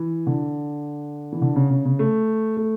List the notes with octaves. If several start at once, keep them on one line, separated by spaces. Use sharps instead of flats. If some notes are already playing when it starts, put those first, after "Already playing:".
Already playing: E3
D3
E3
D3
C#3
C#3
C#3
A3
A3